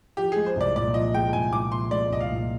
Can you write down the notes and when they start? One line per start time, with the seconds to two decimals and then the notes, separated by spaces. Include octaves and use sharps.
0.17 F3 G4
0.32 G#3 G#4
0.46 C5
0.56 C2 D5
0.76 A#2 D5
0.94 F3 D#5
1.14 G#3 G5
1.33 C2 G#5
1.53 A#2 D6
1.72 F3 C6
1.91 G#3 D5
2.10 C2 D#5
2.21 F5
2.30 A#2